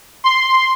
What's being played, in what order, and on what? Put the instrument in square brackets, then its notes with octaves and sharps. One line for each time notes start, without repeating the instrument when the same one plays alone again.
[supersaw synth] C6